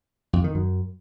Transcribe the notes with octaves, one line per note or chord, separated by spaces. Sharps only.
F2
D#3
F#2